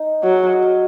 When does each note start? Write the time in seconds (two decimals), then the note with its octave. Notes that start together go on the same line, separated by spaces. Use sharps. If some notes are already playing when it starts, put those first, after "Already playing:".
Already playing: D#4
0.23 F#3 F#4
0.33 G#4
0.43 F5
0.53 D#5
0.62 F5